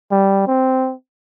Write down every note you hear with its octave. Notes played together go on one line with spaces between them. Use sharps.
G3
C4